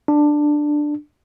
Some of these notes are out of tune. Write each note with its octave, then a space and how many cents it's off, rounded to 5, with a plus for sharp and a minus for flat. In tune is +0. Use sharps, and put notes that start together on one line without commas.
D4 +10